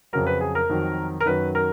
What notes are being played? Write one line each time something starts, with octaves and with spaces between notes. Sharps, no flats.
F2 C#3 F#3 A#4
B4
G#4
A#4
F2 D#3 F#3
A#4
F#2 D#3 F#3 B4
A#4